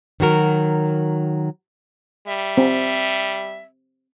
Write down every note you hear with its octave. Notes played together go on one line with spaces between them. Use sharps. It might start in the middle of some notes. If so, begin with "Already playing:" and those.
D#3 F#3 F#4 A#4
G3 E5
C4